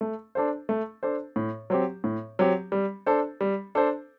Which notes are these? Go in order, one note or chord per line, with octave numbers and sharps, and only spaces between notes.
A3
D4 A4 C5
A3
D4 A4 C5
A2
F#3 C4 G4
A2
F#3 C4 G4
G3
D4 A4 C5
G3
D4 A4 C5